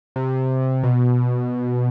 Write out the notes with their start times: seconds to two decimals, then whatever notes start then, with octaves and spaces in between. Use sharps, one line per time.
0.16 C3
0.83 B2